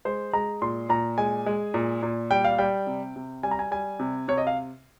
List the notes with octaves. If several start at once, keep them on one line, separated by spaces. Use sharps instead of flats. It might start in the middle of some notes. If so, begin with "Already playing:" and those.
G#3 C5
G#3 A#5
A#2 C6
A#2 A#5
G#3 G#5
G#3
A#2
A#2
G3 G5
F5
G3 G5
C3
C3
G3 G#5
A#5
G#5
G3 G#5
C3
C3 C#5
D#5
F5